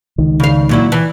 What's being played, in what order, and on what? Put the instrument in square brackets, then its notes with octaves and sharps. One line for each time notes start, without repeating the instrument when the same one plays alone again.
[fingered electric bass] C#2 D#3
[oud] C#3 F5
A#2 F#3 E4
E3